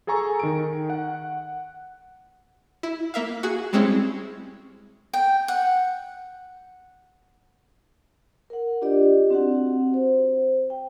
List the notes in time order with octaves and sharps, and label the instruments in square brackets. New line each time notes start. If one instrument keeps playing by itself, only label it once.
[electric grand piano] G#4 A4 G#5 A#5 C#6
D#3 D7
F#5
[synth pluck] E4
A#3 A#4 E5 F5
F#4 G#4 F#5
G3 G#3 C4 C#4 E4 G#4
[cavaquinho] G5
F#5
[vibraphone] A#4 F#5
D4 F4 G4 D5 D#5
C4 F#4 F#5
C5
G5